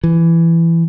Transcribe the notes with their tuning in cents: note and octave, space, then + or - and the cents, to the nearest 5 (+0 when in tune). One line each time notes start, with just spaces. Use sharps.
E3 +15